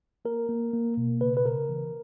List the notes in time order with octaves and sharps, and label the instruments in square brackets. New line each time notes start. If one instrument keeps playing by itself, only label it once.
[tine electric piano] A#3 A#4
A#3
A#3
B2
C#3 B4
B4
C#3 A#4
E3